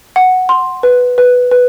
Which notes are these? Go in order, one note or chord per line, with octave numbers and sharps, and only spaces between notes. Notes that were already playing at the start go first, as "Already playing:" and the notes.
F#5
C6
B4
B4
B4